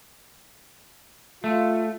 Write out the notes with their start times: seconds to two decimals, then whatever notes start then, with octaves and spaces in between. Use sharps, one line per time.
1.44 A3 F4